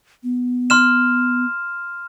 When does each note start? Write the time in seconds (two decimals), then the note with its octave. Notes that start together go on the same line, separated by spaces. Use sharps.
0.23 B3
0.70 C6 F6 E7